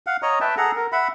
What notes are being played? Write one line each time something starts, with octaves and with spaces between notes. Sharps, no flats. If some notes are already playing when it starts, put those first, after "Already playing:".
F5 F#5
C#5 D#5 A#5
B4 E5 G5 A5
G#4 A4 F#5 A#5
A#4
E5 F#5 B5